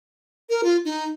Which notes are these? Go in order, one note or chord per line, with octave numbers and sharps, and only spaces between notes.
A#4
F4
D#4